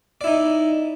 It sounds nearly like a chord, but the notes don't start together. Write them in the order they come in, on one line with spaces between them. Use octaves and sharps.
D5 E4 D#4